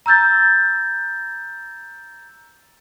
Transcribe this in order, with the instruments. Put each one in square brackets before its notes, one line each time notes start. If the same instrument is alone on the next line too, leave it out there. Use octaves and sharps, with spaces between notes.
[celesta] A#5 E6 G6 A6